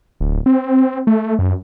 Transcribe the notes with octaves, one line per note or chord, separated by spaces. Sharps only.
D1
C4
A3
F#2